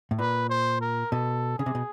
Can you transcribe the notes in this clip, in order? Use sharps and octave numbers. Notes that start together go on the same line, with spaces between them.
A2
A#2 B4
C5
A#4
B2 A4
C#3 G#4
C3
B2